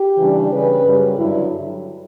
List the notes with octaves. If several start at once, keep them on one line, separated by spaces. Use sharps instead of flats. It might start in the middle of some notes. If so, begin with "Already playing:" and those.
Already playing: G4
C#3 E3 G3 D4
C#3 G3 C#4 B4
F#2 C#3 G3
G2 D3 F#3 E4